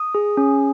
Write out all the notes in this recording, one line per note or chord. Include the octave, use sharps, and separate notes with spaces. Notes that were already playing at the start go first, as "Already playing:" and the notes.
Already playing: D#6
G#4
C#4